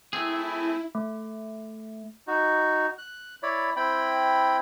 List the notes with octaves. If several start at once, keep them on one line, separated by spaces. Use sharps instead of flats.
A3 C4 E4 G#4
A3
D#4 F#4
F#6
E4 C#5 D5 B5
C4 E4 G5 B5